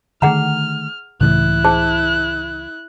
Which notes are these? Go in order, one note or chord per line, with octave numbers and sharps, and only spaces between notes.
D3 D#3 A3 G#4 F#5 A#5 F6
C#2 A2 C#3 E3 A3 E4 F#6
G#4 C5 A5